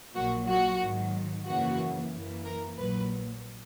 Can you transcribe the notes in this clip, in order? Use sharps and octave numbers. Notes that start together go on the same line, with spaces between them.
A#1 A#2 F#3 A#3 F#4
F#4
G#2 D#3 F#3
F#2 C#3 E3 A#3 F#4
F#2 E3 A#3
A#4
A#1 A#2 F#3 B4